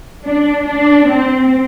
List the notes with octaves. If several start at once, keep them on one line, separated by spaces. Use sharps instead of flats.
D4
D4
C4